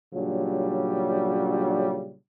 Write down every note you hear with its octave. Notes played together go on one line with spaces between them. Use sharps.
A#2 C#3 F#3 G3 D4